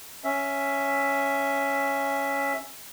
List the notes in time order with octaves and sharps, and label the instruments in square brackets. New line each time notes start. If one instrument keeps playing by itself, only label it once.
[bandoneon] C#4 E5